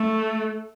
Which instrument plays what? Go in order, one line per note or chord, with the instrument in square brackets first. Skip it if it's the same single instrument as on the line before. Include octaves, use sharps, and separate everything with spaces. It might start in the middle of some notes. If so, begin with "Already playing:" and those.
Already playing: [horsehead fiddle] A3